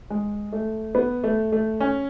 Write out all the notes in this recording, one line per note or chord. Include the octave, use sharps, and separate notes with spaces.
G#3
A3
B3
A3
A3
C#4